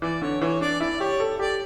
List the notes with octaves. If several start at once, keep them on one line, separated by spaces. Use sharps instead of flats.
E3 D5
D3 C#5
E3 C#5
D4 D5
E4 D5
G4 C#5
A4
G4 D5